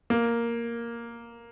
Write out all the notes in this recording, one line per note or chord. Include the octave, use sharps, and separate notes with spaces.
A#3